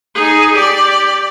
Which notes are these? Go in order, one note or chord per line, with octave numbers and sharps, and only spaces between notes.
D#4 G#4
G4 D5